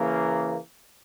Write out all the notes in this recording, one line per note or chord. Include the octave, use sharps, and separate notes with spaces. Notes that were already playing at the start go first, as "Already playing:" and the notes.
Already playing: C#3 E3 A#3